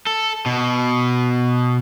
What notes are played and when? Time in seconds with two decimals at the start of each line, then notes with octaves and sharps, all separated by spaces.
0.07 A4
0.46 B2